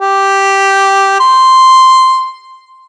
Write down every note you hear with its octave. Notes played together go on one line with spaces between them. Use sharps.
G4
C6